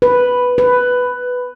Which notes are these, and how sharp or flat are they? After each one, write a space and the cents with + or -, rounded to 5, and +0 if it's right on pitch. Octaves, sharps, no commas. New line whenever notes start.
B4 +0
B4 +10